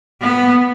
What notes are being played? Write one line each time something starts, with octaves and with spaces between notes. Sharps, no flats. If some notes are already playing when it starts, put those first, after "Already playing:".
B3